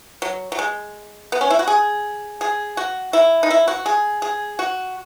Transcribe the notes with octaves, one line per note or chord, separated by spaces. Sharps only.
F#3
F#3
G#3
B3
C#4
E4
F#4
G#4
G#4
F#4
E4
D#4
E4
F#4
G#4
G#4
F#4